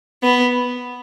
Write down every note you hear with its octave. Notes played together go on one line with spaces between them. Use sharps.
B3